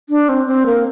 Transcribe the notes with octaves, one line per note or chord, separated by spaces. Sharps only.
D4
C4
C4
A#3